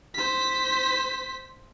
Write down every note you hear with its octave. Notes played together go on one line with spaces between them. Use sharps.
C5 B6